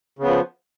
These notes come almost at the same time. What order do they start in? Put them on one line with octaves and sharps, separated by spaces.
C#3 B3 F3